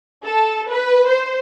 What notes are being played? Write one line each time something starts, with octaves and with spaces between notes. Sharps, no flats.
A4
B4
C5